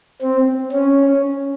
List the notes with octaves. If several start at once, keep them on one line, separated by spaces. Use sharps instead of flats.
C4
C#4